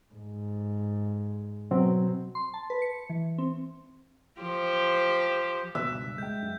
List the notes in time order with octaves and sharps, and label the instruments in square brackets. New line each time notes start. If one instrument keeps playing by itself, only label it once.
[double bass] G#2
[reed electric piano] B2 F#3 C4
[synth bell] C6
A5
B4
C#7
E3
C4
[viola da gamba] F3 G4 C5
[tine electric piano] B2 [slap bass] D#3 F3 A#3 [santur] E5 [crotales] F#6
[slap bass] C#2 G2
[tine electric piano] G#3 G5 [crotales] G6
[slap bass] F#2